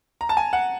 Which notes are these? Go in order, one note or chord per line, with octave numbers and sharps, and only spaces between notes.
A#5
A5
G#5
F#5